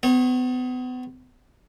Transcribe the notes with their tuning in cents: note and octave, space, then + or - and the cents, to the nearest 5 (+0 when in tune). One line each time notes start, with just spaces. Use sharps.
B3 +35 C#5 -35